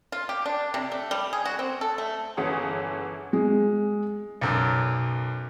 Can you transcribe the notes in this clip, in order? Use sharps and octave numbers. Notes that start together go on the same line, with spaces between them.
F4
G4
D4
C3
A3
G3
G#4
F#4
C4
A4
A3
G1 E3 C#4 G#4 F#5 D#6
G#3
B1 F#2